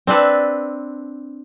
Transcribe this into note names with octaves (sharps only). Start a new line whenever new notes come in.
C4 D4 A4 B4